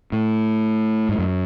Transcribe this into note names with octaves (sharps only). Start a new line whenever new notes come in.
A2
G#2
F#2